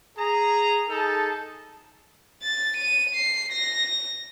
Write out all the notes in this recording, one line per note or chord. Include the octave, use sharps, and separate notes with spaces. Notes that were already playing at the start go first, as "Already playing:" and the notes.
G#4 A#5
D#4 G#4 A4 A5
A6
D#7
C7
A#6